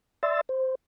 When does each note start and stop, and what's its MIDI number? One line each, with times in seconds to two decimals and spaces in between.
0.23 0.41 74
0.23 0.41 76
0.23 0.41 84
0.23 0.41 88
0.23 0.41 93
0.49 0.75 72